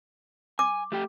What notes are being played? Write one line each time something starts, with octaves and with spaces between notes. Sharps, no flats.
G#5 D6
A3 G4 G5